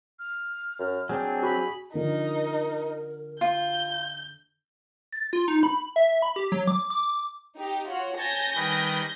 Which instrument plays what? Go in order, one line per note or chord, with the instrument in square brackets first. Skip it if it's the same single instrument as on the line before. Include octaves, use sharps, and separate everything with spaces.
[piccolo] F6
[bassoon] F#2
[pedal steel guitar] F#3 C4 D4 [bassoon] G#4
[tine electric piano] F#4 [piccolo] B5
[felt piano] D3 F3 [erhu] D#4 [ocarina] A#4
[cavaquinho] F4 [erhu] G6
[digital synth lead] A6
F4
D#4
B5
E5
B5
G4
F#3
D6
D6
[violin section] D#4 G4
F4 F#4 C#5
[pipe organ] C#5 A5 [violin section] G#5 G6 A#6
[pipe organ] D#3 G3 B4